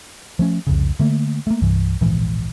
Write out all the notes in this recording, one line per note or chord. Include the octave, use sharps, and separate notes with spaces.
F3 A3 C#4
C2 F2 C#3
D3 A3 A#3
A3 A#3
C2 G2 E3
D1 A#1 G#2 E3